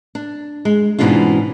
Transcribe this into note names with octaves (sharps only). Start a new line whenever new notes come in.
D4
G#3
G#2 B2 E3 C#4 D4 F4